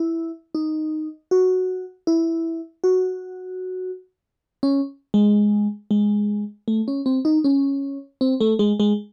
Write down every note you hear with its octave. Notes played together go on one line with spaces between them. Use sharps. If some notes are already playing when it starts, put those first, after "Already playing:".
Already playing: E4
D#4
F#4
E4
F#4
C#4
G#3
G#3
A3
C#4
C4
D#4
C#4
C4
A3
G#3
G#3